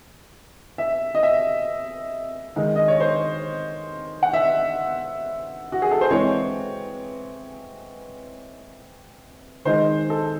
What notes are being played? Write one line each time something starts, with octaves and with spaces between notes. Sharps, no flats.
E5
D#5
E5
D#3 G#3 D#4
D#5
C#5
C5
F#5
E5
F#4
G#4
A4
C5
E3 G#3 C4 C#5
D#3 G#3 D#4 C5
A4